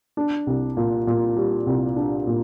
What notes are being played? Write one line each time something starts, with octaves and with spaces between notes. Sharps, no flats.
D4
C2
A#2
A#2
G3
C2
D4
A#2